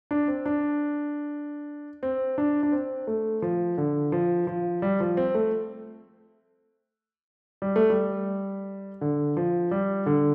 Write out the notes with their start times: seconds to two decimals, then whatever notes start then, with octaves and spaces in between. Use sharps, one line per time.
0.11 D4
0.28 C4
0.46 D4
2.03 C4
2.38 D4
2.63 D4
2.72 C4
3.07 A3
3.42 F3
3.78 D3
4.12 F3
4.47 F3
4.82 G3
5.00 F3
5.17 C4
5.35 A3
7.62 G3
7.76 A3
7.90 G3
9.01 D3
9.37 F3
9.71 G3
10.06 D3